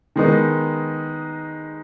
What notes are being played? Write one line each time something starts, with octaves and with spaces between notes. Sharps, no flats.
D#3 G#3 B3 D#4